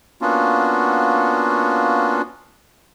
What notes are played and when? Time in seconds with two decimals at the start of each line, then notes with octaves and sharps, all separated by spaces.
0.21 A#3 B3 C#4 D4 F4 F#4